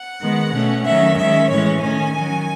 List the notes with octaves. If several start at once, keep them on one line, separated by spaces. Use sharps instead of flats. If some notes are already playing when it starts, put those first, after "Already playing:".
Already playing: F#5
D#3 G#3 B3
B2 A3 C#4
D#3 F#3 A3 C#4 E5
D#3 G#3 C#4 E5
A2 E3 G#3 C#4 C#5
D#3 A3 C#4 G#5
D#3 F#3 C#4